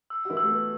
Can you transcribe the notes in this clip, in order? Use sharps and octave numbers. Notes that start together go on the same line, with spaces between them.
E6
F#4
E3 E4
E6
A3
B3